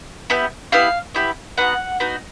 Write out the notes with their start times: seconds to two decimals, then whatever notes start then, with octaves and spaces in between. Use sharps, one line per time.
0.30 B3 E4 G4
0.72 B3 E4 G4 F5
1.15 B3 E4 G4
1.57 B3 D#4 F#4 F#5
2.00 B3 D#4 F#4